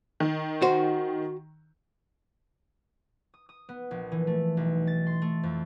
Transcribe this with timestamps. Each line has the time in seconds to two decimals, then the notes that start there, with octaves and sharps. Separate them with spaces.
0.20 D#3
0.62 F#4 C5
3.34 D#6
3.49 D#6
3.69 B3
3.91 A#1
4.12 E3
4.27 A3
4.57 B1
4.87 A6
5.07 C6
5.22 A3
5.43 F2